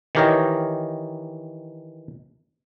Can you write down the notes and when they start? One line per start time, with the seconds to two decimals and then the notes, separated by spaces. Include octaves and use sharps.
0.15 D#3 E3 G4 A#4 C#5 D#5